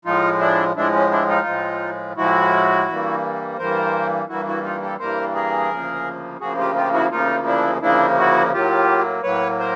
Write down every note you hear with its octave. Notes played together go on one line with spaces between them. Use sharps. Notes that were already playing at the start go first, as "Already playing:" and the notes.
A2 F3 G#3 D#4 F4
D4 E4
A2 F3 G#3 D4 E4
C#4
D4 E4
D#4 F4
A2 F3 G#3
A2 F3 G#3 E4 F#4
G2 E3 G3 A#3
G2 E3 G3 A#3 A#4 C5
G2 E3 G3 A#3 E4 F#4
E4 F#4
D#4 F4
G4 A4
G2 E3 G3 A#3 A#4 C5
G#4 A#4
D2 C#3 F3 A#3
D2 C#3 F3 A#3 F#4 G#4
F4 G4
F4 G4
E4 F#4
D2 C#3 F3 A#3 D#4 F4
D4 E4
D2 C#3 F3 A#3 D4 E4
E4 F#4
A2 F#3 A#3 F4 G4
A2 F#3 A#3 B4 C#5
A#4 C5